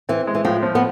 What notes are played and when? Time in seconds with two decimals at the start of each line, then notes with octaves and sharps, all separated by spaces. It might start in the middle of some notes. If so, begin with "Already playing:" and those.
0.09 E3 C4
0.27 G#3
0.35 E3
0.45 A2 F3
0.63 F3
0.75 B3